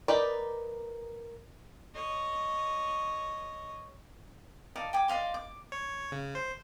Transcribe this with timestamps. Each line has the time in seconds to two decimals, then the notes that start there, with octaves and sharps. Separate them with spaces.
0.08 D#4 A#4 B4 D5
1.95 C#5 D#5
4.76 D#4 D5 F5 A5
4.93 G5 G#5 D6
5.08 D5 D#5 F5 C6
5.34 D6
5.72 C#5
6.12 C#3
6.35 C5